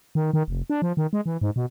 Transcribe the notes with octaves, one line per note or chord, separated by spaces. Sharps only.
D#3
D#3
F1
D4
F3
D#3
G#3
E3
G#2
B2